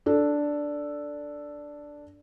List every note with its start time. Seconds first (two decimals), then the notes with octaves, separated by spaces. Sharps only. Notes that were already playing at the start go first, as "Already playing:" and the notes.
0.06 D4 A4